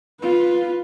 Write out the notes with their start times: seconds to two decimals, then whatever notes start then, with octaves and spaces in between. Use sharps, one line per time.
0.22 F4 B4